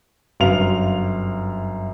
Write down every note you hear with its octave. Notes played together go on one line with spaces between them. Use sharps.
G1 F#2 F5 F7